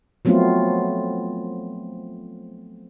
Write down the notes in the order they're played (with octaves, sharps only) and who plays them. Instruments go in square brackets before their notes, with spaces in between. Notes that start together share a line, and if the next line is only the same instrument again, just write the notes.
[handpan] F3 F#3 A3 B3 C4 F4